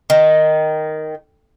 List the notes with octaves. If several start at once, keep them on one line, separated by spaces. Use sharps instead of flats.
D#3